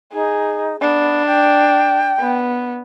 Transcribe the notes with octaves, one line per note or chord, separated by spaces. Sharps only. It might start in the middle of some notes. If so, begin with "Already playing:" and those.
D#4 G#4
B3 D4
G5
B3